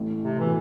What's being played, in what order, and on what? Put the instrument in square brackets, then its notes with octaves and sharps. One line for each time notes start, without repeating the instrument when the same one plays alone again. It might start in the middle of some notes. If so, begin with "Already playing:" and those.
Already playing: [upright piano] A1 A2
[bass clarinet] C3
[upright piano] A2
[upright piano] B2 [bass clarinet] E3